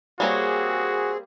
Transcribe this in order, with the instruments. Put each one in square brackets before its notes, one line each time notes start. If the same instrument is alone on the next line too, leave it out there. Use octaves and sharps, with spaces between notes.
[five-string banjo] G3 A#3 C#5 [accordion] C4 G#4 [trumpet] F#4